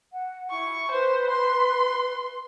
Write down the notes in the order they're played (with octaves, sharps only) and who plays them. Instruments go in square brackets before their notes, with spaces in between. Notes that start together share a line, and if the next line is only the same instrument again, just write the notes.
[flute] F#5
[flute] E4 [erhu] C#6
[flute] B4 [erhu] C5
[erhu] C6